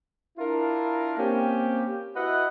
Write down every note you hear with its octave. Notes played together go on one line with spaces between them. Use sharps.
D4 E4 F4 A#4
A#3 C4 C#4 G4
E4 F#4 B4 D#5 E5 F#5